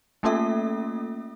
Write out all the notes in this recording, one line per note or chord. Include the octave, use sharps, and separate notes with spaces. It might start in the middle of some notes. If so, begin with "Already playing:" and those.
A3 A#3 C#4 F4 A4 E5